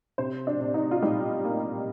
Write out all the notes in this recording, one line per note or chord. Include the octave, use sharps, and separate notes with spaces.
C3 C5
D4
C3
D#4
F4
G3 D#4
A#3